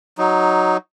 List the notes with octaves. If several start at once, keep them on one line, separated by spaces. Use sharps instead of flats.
F#3 D#4